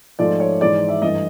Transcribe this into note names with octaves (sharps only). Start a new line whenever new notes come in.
G#2 F3 A3 D5
C#5
G#2 E3 G#3 D5
E5
G2 E3 A3 D#5